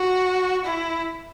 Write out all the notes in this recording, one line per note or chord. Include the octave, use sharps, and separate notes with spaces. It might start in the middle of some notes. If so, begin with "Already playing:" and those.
Already playing: F#4
E4